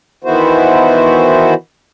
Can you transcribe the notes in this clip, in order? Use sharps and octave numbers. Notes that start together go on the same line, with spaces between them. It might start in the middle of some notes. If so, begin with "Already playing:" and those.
D#3 E3 B3 E4 F#4 C5